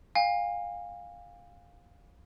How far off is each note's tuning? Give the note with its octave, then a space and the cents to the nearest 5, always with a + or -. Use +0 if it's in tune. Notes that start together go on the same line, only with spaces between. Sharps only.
F5 +15 G#5 -45